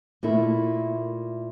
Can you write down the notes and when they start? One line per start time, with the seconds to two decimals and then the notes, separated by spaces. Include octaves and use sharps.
0.23 A#2 A3 E4